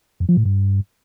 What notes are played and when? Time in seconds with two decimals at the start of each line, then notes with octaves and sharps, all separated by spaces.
0.20 F2
0.29 F3
0.37 A2
0.45 G2